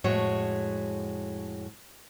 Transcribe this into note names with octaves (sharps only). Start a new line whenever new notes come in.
F2 A2 G#3 F#4 C#5